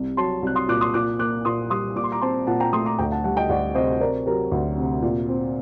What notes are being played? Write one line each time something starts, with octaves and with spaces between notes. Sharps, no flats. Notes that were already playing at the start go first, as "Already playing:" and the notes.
Already playing: C2
F#3 A5 C6
C2 F#6
C6 D#6
A#2 D6 F#6
C6 D#6
A#2 D6 F#6
A#3 D6 F#6
A#2 C6 D#6
G3 C6 D#6
A#2 D6
C6
A#5 D6
C4 A5 C6
A#2 F#5 A5
G5 A#5
A3 C6 D#6
A#5 D6
D2 G5 A#5
F#5 A5
G3 F#5 A5
D#5 G5
D2 D5 F#5
C3 C5 D#5
C4 A#4 D5
F#3 G4 A#4
D2
C3
A#2
C4